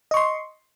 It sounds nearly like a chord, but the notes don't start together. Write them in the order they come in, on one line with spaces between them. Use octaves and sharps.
D#5 C#6 C6